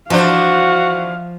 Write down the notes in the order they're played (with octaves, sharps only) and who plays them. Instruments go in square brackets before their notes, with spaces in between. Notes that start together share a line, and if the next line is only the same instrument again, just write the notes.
[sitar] E3 D4 C5 [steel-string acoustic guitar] F3 [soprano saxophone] F#4 [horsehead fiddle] F5